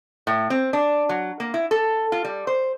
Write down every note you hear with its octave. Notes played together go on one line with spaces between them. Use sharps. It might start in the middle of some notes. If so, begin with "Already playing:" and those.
A2
C4
D4
F#3
A#3
E4
A4
F4
G3
C5